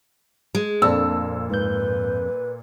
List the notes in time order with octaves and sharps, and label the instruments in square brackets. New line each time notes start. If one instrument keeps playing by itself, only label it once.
[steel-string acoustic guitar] G#3
[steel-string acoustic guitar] F2 [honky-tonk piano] A#2 E6 [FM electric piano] C4 D4 A4
[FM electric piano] G#2 G6 [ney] B4